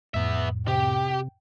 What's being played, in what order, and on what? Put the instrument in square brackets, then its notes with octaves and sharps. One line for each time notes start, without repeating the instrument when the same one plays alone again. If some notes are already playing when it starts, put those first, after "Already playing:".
[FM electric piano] F2 A2 [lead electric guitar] B3 E5
[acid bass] C3 [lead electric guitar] G4 [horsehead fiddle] G5